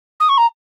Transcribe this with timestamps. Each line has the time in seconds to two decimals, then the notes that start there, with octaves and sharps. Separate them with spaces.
0.20 D#6
0.29 C#6
0.38 A#5